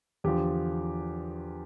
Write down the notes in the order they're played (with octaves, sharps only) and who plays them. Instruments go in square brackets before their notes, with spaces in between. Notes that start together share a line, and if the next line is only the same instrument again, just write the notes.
[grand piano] E2 D3 F3 G4